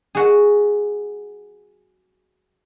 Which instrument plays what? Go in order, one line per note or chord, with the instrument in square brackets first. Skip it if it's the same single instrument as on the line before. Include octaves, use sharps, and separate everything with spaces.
[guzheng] F#4 G#4